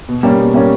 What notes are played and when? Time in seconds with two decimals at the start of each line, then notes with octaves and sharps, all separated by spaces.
0.09 B2
0.23 G3 A#3 C#4
0.39 B2
0.54 G3 A#3 C#4